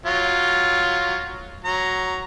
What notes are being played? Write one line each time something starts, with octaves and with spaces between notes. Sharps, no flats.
F#3 F4
F#3 A#5